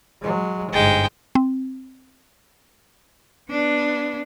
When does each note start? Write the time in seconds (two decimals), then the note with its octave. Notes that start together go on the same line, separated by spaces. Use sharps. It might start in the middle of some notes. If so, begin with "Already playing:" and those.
0.22 F#3 G#3
0.73 G1 G#2 G#3 G5
1.35 C4
3.50 B3 D4